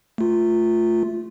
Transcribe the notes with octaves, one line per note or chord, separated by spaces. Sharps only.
A3 F4